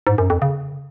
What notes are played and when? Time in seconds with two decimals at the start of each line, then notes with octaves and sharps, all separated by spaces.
0.07 G#2
0.18 F#2
0.30 F2
0.42 C#3